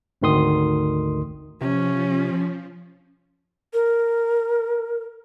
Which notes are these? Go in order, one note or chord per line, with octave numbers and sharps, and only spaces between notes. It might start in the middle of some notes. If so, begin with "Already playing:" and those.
G#1 D2 D#3 C6 D#6
C3 F3 C#4
A#4